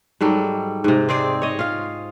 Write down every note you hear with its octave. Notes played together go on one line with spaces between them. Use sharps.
G#2 F#3 G3 A4
G#2 C3
C4 G#4 C5 D5
C#5 D#5
F4 F5